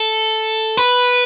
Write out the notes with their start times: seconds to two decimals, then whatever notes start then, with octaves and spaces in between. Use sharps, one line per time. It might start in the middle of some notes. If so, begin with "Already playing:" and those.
Already playing: A4
0.77 B4